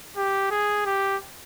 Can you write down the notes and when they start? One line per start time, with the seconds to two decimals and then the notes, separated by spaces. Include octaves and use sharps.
0.17 G4
0.51 G#4
0.86 G4